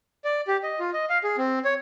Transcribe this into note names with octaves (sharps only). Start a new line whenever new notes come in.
D5
G4
D#5
F4
D#5
F5
G#4
C4
C#5